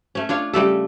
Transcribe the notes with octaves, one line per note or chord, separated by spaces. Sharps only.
A3 C#4
D4 F4 C#5 F5
C#3 G3 A3 A4